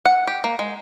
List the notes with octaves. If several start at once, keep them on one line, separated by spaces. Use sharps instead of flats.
F#5
G4
A#3
G#3